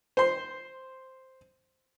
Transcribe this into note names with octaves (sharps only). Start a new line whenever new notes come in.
C5 C6